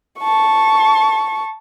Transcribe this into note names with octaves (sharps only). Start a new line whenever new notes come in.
A5 C#6